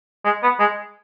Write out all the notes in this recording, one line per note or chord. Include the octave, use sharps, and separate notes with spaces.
G#3
B3
G#3